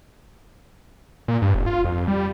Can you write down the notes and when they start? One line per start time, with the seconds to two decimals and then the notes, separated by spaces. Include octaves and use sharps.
1.28 A#2
1.42 G2
1.54 F1
1.66 F4
1.85 F2
2.08 G3